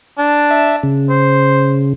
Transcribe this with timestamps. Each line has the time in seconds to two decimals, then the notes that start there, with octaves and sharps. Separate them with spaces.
0.18 D4
0.51 E5
0.83 C#3
1.09 C5